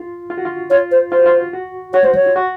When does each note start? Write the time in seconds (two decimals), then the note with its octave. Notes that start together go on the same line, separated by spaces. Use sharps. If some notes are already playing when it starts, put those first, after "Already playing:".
Already playing: F4
0.30 F4
0.38 F#4
0.45 F4
0.70 F4 C#5
0.91 C5
1.12 F4 C5
1.19 F#4
1.26 F4
1.53 F#4
1.94 F#4 C#5
2.04 C5
2.15 C#5
2.26 F4
2.36 F#4